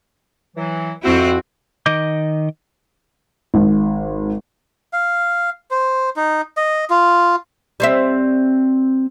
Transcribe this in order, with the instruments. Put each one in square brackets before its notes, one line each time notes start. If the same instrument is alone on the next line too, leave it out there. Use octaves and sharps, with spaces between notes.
[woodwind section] E3 F#3
[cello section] F2 C4 E4 [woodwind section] F#4
[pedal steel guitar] D#3 D#5 D6 G6
[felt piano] G#1 G#2
[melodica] F5
C5
D#4
D#5
F4
[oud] G3 C4 E5